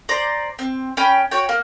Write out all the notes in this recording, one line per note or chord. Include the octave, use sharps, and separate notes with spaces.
C5 D5 A#5
C4
C#4 G5 B5
F#4 C#5 G5
A#3